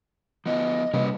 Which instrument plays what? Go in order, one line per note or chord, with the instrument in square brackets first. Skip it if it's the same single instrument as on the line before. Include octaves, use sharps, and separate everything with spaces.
[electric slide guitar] F3 B3 F4 [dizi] D#5
[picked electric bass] C3 G3 A#3 [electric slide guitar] C#4 B4